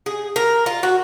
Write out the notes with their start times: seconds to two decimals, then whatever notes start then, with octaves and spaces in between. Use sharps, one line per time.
0.06 G#4
0.36 A#4
0.66 F4
0.83 F#4